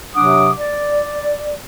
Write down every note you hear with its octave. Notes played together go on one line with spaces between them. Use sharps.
C3 F#3 D4 F#5 D6 D#6
D5